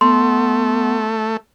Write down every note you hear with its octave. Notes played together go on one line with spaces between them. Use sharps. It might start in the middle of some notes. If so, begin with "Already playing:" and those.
A3 B3 C6